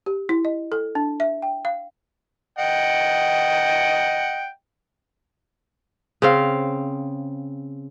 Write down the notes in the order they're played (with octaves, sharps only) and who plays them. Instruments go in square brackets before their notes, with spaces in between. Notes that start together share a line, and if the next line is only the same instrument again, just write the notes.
[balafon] G4
E4
D#5
A4
D4
E5
G5
F5
[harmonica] D#5 F#5 G5
[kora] C#3 C4 F5